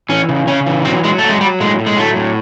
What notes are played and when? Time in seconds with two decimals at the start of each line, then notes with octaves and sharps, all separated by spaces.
0.09 E3 C#4
0.29 C#3
0.47 C#3 C#4
0.66 E3
0.85 F#3 C4
1.04 F#3 G#3
1.19 F#3 A3
1.29 G#3
1.41 F#3 G3
1.60 A2 G#3
1.79 A2
1.87 G#3
1.97 F#3 A3
2.16 A2